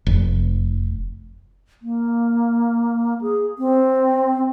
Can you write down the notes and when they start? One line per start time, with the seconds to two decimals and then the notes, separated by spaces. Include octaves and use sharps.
0.07 F1
1.82 A#3
3.21 G#4
3.59 C4